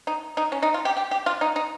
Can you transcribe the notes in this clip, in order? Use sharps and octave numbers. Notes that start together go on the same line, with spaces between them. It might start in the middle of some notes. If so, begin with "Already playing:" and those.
D#4
D#4
C#4
D#4
F4
G4
G4
G4
F4
D#4
D#4